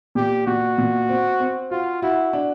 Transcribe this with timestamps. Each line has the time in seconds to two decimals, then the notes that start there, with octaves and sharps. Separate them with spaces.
0.15 A#2 G4
0.47 A#2 F#4
0.78 A#2
1.09 C4
1.40 C4
1.71 F4 F#4
2.02 E4 F#4
2.33 D4